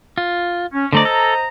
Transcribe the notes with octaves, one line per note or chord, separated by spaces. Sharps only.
F4
C#4
D3 A3 C5 D5 D#5 A#5
A4